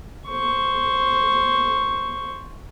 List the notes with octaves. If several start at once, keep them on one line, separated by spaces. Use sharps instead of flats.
C5 C#6